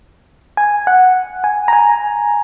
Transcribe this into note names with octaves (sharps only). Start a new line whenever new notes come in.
G#5
F#5
G#5
A#5
G#5